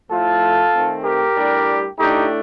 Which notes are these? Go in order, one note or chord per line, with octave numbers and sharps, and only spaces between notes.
A2 F3 A3 F4 A4
D#3 A3 C4
G4 A#4
A2 G3 D4
A2 A3 D4 D#4 G4